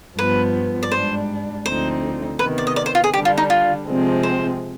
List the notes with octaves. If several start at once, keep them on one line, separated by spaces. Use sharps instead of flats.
G2 F3 B3 B4
D5
G#2 G3 D4 C5
D2 D3 F3 C4 D#4 C5
C3 D#3 B3 B4
D5
D#5
D5
C5
F4
G#4
D3 G3 D4 G4
F4
D#4
F4
C3 F3 G#3 C4
C5